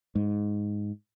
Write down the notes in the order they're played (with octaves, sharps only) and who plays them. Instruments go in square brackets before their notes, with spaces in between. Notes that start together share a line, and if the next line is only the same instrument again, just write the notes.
[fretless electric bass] G#2